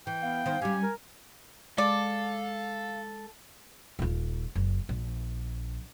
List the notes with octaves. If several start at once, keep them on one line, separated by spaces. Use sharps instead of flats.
E3 G5
B3 F5
D#3 C5
G3 C#4 G4 G#5
A#4
G#3 A4 D5 F5
D#1 F4
F#1
A#1